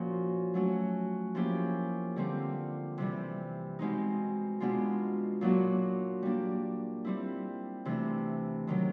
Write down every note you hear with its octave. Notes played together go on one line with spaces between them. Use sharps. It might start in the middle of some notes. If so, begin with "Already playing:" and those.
Already playing: A#2 F3 A#3 C#4 F#4
F#3 A3 C#4 F#4
F3 A#3 C#4 E4 G4
D3 G3 C4 F4
C3 E3 G3
B2 G#3 C4 D#4
B2 G#3 B3 D4 F4
A#2 F#3 A#3 D4 F#4
G3 A#3 D4
G3 C4 E4
C3 E3 A3 D4
C3 D#3 F#3